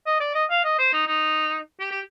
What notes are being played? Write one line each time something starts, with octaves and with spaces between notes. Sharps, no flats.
D#5
D5
D#5
F5
D#5
C5
D#4
D#4
G4
G4